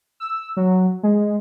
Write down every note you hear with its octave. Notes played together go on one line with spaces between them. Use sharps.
E6
F#3
G#3